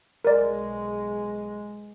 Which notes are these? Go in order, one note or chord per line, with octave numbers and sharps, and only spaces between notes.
B1 G#3 A#4 D5